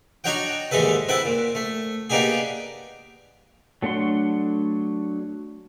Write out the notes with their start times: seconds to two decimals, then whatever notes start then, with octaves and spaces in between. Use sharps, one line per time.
0.24 D4 D#4 F#4 C#5 F#5 G5
0.71 D#2 G#2 E3 G#3 A4 B4
1.08 C4 E4 B4 F#5 A5
1.25 A#2
1.55 A3
2.10 A#3 B3 D4 D#4 G4 G#4
3.82 F#3 A3 D4 F#5 C6